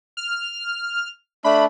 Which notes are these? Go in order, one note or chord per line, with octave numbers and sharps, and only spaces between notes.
F6
A3 D4 B5